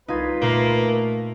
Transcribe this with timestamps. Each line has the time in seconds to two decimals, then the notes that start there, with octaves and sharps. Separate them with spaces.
0.08 C2 D#4 F4 B4 G#6
0.42 A#2 A3 A#3